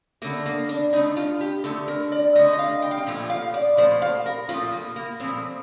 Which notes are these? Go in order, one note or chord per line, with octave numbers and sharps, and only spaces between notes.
D3 A3 A#3
A#3
D4
D3 A3 D#4
F4
G4
D3 A3 A4
A#4
D5
D3 A3 D#5
D#5
F5
G5
F5
G5
A#2 F3 A3
F5
D5
A#2 F3 A3 C5
F5
A#4
A#2 F3 A3 F4
A#3
A#3
A#2 F3 A3 C4